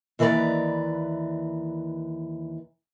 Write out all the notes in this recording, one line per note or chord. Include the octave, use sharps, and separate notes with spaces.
D#2 E3 B4 C5 D5 A#5